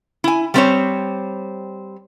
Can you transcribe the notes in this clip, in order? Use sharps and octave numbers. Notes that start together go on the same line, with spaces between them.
E4 G#5
G3 A3 C4 D#4 C5 C#5